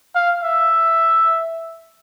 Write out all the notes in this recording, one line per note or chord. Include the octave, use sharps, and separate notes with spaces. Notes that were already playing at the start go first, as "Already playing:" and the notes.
F5
E5